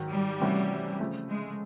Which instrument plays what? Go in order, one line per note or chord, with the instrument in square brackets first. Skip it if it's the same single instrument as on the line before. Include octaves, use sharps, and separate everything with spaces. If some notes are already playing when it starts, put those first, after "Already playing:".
Already playing: [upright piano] G#2 D#3 F#3
[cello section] G3
[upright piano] C3 E3 A3 C#4 F#4
C#3 F3 A3
[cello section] G#3